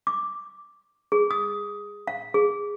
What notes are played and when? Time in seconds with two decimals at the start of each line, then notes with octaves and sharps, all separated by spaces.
0.07 D6
1.12 G#4
1.31 D#6
2.07 F5
2.34 G#4